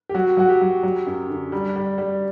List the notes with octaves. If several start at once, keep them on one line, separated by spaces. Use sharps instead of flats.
G4
F#3 F#4
F#3 F#4
G4
F#3
F#3
F#2
D3
G3
G3
G3